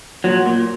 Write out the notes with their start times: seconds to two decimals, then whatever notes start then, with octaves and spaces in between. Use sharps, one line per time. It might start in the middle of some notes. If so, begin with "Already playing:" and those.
0.24 A#2 F#3
0.46 A#2